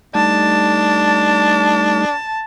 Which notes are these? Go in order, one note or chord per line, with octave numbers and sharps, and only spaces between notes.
G3 A3 D4 D#4 A5